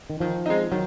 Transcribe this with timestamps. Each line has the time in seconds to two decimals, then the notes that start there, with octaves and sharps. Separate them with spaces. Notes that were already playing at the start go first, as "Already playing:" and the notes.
0.10 D#3
0.20 D#3 F3
0.46 G#3 C4 D#4
0.71 D#3 F#3